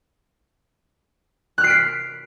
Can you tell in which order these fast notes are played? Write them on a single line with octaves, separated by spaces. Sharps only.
F#6 F6 C7 D7 B6